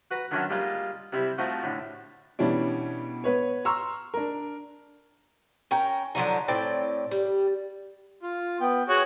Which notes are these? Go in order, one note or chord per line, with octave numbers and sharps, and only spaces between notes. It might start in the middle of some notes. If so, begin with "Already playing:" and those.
F#4 B4 A#5
D3 D#3 F#3 C#4 D4 E5
G3 G#3 A#3 D#4 F4 F5
C3 G3 C4 E4
F3 A3 C4 D#4 F#4
A2 D3
B2 E3 G3 C#4 D4
B3 B4 C#5
A#5 C6 C#6 E6 F6
D4 A#4
C#4 A#4 G5
D3 F3 F#3 D#4
A2 C4 D5 G5
G3
F4
B3 G5
F#4 G#4 C#5